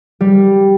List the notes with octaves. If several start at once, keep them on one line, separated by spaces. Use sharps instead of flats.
G3